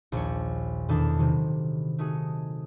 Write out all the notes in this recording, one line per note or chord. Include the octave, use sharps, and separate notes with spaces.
A#1 D#2 C#5
E2 B2 D#3 D4 A4 E5
C3 D#3 F#3
A3 D#4 F#4 G#4